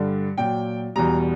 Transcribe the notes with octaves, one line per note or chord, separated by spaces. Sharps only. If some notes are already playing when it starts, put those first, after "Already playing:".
Already playing: G2 D3 G3
A#2 F#3 G5
E2 B2 G3 A#5